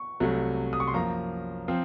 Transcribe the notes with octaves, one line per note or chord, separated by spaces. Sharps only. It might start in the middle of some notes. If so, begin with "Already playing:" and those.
Already playing: C#6
C2 C3 F#3 A3
D#6
C#6
C6
F#2 F3 A#3 A#5
F3 C4